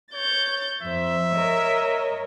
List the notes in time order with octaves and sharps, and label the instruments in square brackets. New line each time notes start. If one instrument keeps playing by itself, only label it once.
[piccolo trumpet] C#5 [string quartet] G6 A6
[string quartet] F2 C5 [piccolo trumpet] E5
[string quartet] A#4 C#5 D#5